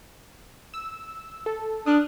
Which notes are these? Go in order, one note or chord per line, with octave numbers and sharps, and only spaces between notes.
E6
A4
D4 D#6 F6 F#6